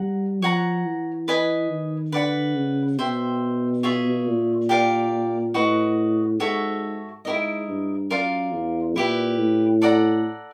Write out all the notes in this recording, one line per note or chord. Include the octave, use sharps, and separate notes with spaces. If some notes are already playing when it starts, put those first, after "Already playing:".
Already playing: G3 F#5 A#5
F3 C#5 F#5 A#5
E3
B4 D#5 G#5 B5
D#3
D3 B4 D5 F#5 B5
C#3
B2 C5 E5 G5
F4 G#4 C#5 E5
A#2
G4 A#4 D5 F5
A2 F#4 B4 D#5
G#2 F#4 A4 C#5 E5
G#2 E4 G4 A#4 D#5
G2
F#2 F4 A#4 D5 F5
E2
A#2 E4 G4 B4
A2
A4 D5 F#5 A#5